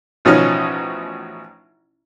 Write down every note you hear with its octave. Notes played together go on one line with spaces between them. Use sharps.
A1 B2 F3 C#4 D#4 F6